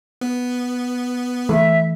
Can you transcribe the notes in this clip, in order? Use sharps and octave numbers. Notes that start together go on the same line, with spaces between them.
B3
E3 A3 E5